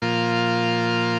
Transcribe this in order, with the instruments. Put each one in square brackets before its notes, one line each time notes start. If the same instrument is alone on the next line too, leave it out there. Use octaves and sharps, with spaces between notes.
[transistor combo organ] A#2 F3 A#3 F4